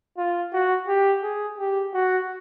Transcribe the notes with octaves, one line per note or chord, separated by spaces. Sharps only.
F4
F#4
G4
G#4
G4
F#4